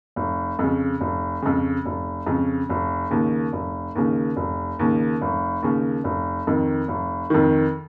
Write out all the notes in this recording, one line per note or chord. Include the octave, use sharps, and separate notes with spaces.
F1
F2 C#3
F1
F2 C#3
F1
F2 C#3
F1
D#2 C#3
F1
D#2 C#3
F1
D#2 C#3
F1
D#2 C#3
F1
F2 D#3
F1
F2 D#3